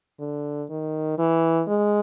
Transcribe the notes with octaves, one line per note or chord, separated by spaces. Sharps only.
D3
D#3
E3
G#3